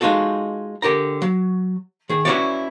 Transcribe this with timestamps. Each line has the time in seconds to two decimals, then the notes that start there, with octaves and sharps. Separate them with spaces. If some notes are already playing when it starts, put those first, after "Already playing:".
0.01 G#3 D#4 F4 F#4 A4
0.82 D3 G4 A#4 A#5
1.22 F#3
2.09 D#3 G#4
2.25 C#4 E4 F#4 B4 C#5 D5